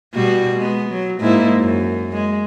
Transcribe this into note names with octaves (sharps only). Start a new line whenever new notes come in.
B2 G3 F#4
G#3 B3
F#3
G#2 A#3 E4
F#2
G#3